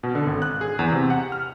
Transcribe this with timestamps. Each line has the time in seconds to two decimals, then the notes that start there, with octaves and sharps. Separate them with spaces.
0.03 B2
0.15 D3
0.27 G#1
0.42 F#6
0.61 G#4
0.79 E2
0.92 C3
1.10 F#5
1.32 F6